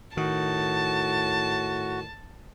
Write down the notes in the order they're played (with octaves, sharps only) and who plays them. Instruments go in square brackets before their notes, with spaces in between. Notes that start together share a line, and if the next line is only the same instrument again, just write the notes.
[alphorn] A2 [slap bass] D#3 [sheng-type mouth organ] F#4 [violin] A5